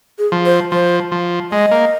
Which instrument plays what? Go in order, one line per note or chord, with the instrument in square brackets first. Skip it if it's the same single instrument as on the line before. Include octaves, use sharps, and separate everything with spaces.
[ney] G#4
[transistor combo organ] F3
[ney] C5
[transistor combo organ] F3 [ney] C5
[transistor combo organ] F3
[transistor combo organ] G#3 [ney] D#5
[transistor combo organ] A#3